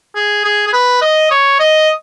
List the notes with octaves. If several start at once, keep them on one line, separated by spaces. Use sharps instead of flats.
G#4
G#4
G#4
B4
D#5
C#5
D#5